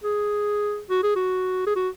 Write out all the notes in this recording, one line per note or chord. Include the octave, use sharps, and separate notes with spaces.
G#4
F#4
G#4
F#4
G#4
F#4